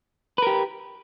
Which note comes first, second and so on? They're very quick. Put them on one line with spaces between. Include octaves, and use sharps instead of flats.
B4 A#4 G4